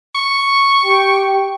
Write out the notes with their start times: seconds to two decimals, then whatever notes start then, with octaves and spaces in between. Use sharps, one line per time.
0.15 C#6
0.82 G4 G5